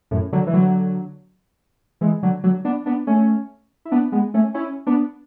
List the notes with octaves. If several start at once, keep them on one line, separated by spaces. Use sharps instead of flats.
F#2 A2
D3 F#3
E3
D3 F#3
E3 G#3
D3 F#3
D3 F#3
B3 D4
B3 D4
A3 C#4
E4
B3 D4
G#3 B3
A3 C#4
C#4 E4
B3 D4